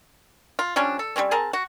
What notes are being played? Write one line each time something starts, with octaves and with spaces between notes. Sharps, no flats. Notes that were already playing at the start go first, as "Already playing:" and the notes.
F4
F3 G3 C#4 D4
A4
G3 G#3 C4 C#4
C4 G#4 A#4 A5
F#4